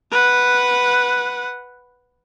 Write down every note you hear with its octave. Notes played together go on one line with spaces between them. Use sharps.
B4 F#5